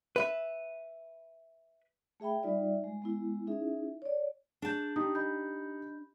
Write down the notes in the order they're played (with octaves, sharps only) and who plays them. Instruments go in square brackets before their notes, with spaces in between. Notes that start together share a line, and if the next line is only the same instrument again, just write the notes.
[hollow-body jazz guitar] B4 E5
[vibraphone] A3 G#4 E5 G5 B5
G3 D#4 F4 D5 E5
G#3
G#3 B3 E4
C#4 D#4 E4 G#4 E5
C#5 D5
[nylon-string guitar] D4 A5 [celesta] G#4 G6
[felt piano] D#4 G4 [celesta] D#6
[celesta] D#5 B5 G6